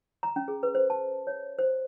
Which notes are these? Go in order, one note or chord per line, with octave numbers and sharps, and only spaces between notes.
A#5
C#4
G#4
B4
C5
A5
C#5
C5